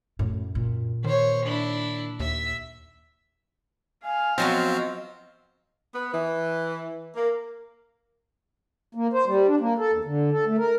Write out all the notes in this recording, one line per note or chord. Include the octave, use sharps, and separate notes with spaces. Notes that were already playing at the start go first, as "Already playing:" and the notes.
F#2 A2
A#2
D#3 C5 C#5
D4 E4
D#2 E5 B6
F5 G#5
F3 F#3 B3 C4 D#5
B3
E3
A#3
A#3
C5
G3
D4
A#3
A4
E2
D3
A4
A3
A#4